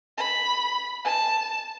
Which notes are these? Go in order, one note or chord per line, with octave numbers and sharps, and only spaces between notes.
B5
A5